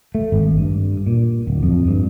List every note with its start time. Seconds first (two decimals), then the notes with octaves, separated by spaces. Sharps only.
0.15 A3
0.32 G#1
0.58 G2
1.07 A#2
1.47 D1
1.63 F2
1.88 G2